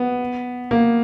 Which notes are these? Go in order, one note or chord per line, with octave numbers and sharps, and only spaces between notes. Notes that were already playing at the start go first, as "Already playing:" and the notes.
Already playing: B3
A#3